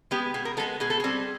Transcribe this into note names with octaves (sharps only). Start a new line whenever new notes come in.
G#3 B3 G4
B2 G#4
A#4
G#3 B3 A4
B2 G#4
A4
G3 C4 G#4